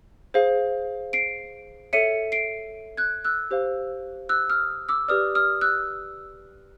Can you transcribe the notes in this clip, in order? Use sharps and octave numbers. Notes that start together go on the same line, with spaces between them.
G#4 C5 F5
C7 D7
A4 C#5 E5 C#7 D#7
C7 D7
F#6 G#6
E6 F#6
G4 C5 F5
E6 F#6
D#6 F6
D6 E6
G4 B4 D5 D#6 F6
D#6 F6
E6 F#6